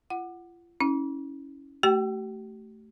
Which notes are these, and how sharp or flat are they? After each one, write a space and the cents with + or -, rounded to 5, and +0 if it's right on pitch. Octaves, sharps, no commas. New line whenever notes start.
F4 -35 F#5 +0
C#4 +0 E4 -30
A3 +0 G4 -40 G5 +0